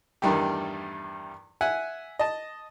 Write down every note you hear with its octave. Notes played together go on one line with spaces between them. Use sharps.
E2 G2 D#3 G3 A3 G4
E5 F#5 G#5
D#5 A5